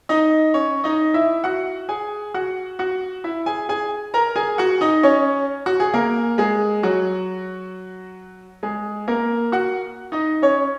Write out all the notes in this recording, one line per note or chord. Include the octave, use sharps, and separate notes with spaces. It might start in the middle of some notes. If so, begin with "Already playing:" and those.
D#4 D#5
C#4 C#5
D#4 D#5
E4 E5
F#4 F#5
G#4 G#5
F#4 F#5
F#4 F#5
E4 E5
G#4 G#5
G#4 G#5
A#4 A#5
G#4 G#5
F#4 F#5
D#4 D#5
C#4 C#5
F#4
G#4
A#3 A#4
G#3 G#4
F#3 F#4
G#3 G#4
A#3 A#4
F#4 F#5
D#4 D#5
C#4 C#5